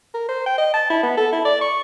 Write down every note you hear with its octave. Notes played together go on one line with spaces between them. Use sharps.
A#4
C5
G5
D#5
A5
E4
B3
A4
E4
D5
C#6